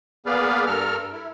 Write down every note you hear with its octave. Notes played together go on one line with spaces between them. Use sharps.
A#3 B3 G#4 B4 D5 F5
G2 A4 A#4 F6
E4